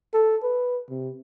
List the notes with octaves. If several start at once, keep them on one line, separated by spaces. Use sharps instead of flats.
A4
B4
C3